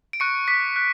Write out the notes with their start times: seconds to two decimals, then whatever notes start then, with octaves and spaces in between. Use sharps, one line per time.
0.13 D7
0.20 C#6 F#6 C#7
0.48 D6 B6
0.76 F#6